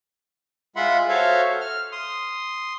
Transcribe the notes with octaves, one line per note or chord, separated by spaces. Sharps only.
G#3 F4 E5 F#5 B5 C6
F#4 A4 C5 C#5 E5 F5
F6
C6 D#6